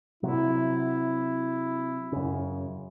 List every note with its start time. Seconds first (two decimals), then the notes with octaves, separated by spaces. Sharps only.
0.23 C3 F#3 E4
2.12 F#2 C#3